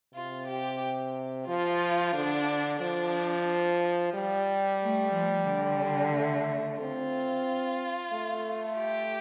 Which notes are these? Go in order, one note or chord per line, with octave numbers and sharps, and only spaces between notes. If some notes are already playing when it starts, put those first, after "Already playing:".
C3 F4
G4
F3 F4
D3 D4
F3 D4
G3
A3
F3
D3
A3
C4 F4
A3
G4